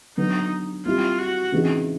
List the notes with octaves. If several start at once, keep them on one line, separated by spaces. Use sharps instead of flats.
D3 F#3 B3 D#4
G3 C4 E4 F4 G4
F#4
C#3 E3 G#3 C4 D#4